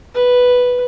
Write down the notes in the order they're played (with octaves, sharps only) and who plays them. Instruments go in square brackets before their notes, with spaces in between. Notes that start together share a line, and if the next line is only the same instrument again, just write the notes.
[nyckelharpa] B4